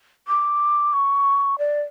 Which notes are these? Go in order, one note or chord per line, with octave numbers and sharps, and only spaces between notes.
D6
C#6
D5